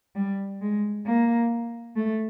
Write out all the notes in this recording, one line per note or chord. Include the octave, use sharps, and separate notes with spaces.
G3
G#3
A#3
A3